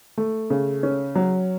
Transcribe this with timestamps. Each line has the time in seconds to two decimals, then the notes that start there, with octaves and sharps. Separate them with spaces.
0.17 A3
0.50 C#3
0.83 C#4
1.15 F#3